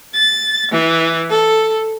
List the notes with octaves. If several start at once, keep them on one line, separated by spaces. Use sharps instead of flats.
A6
E3
A4